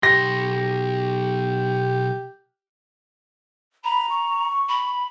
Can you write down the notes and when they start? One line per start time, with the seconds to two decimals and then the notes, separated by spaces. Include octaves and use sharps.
0.03 B1 G4 C6 A#6
3.84 A#5 B5
4.09 C#6
4.69 B5